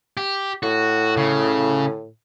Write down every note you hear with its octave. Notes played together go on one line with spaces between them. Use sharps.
G4
A2 F#4
C#3